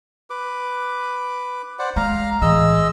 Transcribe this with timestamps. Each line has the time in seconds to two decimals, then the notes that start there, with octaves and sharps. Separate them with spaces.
0.30 B4 D6
1.79 C5 D5 F#5
1.96 G#3 F5 A#5
2.42 A2 E3 G#3 D#5 E6